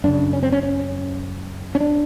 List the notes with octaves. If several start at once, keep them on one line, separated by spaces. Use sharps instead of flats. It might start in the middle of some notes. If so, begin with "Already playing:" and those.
F#2 C#3 D4
C#4
C4
C#4
C#4
C#4
D4